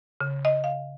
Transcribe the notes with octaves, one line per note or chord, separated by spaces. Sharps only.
C#3
D#5
F5